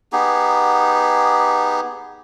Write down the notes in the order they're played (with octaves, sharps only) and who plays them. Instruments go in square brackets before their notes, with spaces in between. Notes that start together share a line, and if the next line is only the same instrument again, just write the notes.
[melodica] B3 D#4 G4 G#4